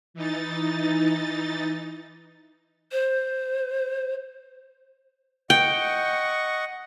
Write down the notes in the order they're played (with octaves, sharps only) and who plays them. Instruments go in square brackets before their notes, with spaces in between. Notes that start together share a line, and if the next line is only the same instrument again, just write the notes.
[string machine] E3 D#4 A6
[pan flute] C5
[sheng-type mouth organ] D#5 F#5 C#6 [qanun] G5